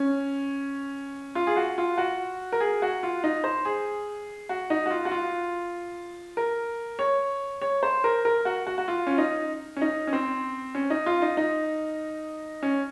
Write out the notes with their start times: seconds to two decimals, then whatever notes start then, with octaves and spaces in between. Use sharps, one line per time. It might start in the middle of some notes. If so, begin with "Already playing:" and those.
Already playing: C#4
1.35 F4
1.47 G#4
1.56 F#4
1.78 F4
1.98 F#4
2.53 A#4
2.60 G#4
2.82 F#4
3.03 F4
3.24 D#4
3.44 C5
3.65 G#4
4.49 F#4
4.70 D#4
4.86 F#4
4.91 F4
5.05 F#4
5.11 F4
6.37 A#4
6.99 C#5
7.62 C#5
7.83 C5
8.04 A#4
8.25 A#4
8.45 F#4
8.67 F#4
8.78 F#4
8.88 F4
9.07 C#4
9.18 D#4
9.76 C#4
9.81 D#4
10.07 C#4
10.13 C4
10.75 C#4
10.90 D#4
11.06 F4
11.22 D#4
11.37 D#4
12.63 C#4